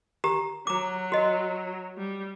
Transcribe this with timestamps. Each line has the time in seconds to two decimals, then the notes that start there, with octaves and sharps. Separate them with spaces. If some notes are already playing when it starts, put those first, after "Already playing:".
0.24 G4 A#5
0.67 F#3 A#5 D6
1.12 F#4 D#5
1.98 G3